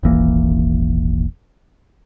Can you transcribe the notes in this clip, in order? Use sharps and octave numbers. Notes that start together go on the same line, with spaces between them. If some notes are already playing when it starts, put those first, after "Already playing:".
D#1 G#1 E3 A#3